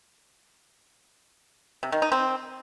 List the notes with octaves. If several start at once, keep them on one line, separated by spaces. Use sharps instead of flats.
C3
D#3
D#4
C4